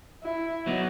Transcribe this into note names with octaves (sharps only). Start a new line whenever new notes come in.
E4
F#3 B3 D#4